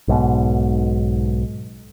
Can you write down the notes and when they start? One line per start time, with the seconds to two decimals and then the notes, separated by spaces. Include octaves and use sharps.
0.08 B1 G#2 B2